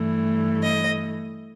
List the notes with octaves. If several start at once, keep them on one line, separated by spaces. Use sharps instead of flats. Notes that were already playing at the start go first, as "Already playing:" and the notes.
Already playing: G2 E3 A3
D#5